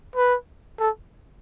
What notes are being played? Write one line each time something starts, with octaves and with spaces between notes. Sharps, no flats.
B4
A4